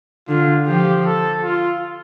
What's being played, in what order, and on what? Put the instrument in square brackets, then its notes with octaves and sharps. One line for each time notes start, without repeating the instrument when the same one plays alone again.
[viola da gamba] D3 [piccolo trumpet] F4
[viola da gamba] F3 [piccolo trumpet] G4
[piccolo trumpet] A4
F4